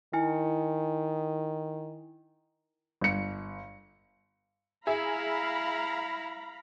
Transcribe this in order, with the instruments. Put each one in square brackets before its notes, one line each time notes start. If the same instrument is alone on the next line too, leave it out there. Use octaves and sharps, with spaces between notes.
[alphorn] D#3 [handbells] E4 G#5
[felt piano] G1 C#7
[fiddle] E4 [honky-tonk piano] G#4 E5 [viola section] F5 A#5 B5